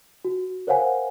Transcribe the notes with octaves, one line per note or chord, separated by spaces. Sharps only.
F#4
A#4 C5 C#5 F5 F#5 G#5